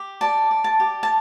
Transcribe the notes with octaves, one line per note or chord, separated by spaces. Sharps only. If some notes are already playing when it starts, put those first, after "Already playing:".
Already playing: G4
D5 A5
D5
A5
G4
A5